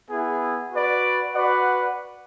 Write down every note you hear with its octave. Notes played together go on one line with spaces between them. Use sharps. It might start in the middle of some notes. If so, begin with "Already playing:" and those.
B3 E4 G#4
F#4 B4 D5
F#4 B4 D5 F#5